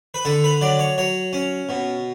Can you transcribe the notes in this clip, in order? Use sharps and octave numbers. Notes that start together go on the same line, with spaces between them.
B4
D3 A4
B4
F#3 D5
C#5
F#3 C#5
C#4
B2